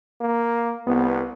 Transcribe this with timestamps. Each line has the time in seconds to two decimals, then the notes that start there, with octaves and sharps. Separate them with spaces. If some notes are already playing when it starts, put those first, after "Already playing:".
0.21 A#3
0.87 C2 B3